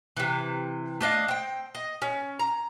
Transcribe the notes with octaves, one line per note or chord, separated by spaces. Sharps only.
C3 E3
A3 D4 D#5 F5
C4 G5
D#5
C#4
A#5